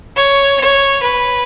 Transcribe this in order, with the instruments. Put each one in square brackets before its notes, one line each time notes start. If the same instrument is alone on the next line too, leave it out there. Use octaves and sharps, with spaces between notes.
[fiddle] C#5
C#5
B4